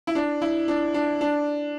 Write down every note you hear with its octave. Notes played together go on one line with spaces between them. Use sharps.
E4
D4
E4
D4
D4
D4